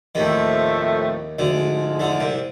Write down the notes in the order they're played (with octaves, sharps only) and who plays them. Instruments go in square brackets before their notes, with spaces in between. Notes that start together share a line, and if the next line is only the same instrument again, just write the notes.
[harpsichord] D#2 D#3 [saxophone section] A2 F3 A3 C4
[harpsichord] D2 D3 [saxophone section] G#2 F3 G#3
[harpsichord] D2 D3
C2 C3